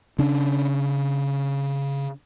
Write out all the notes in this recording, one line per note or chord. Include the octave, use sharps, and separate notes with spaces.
C#3 C#4 D4